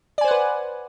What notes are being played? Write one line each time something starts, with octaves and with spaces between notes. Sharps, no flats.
B4 C5 D5 F#5 G#5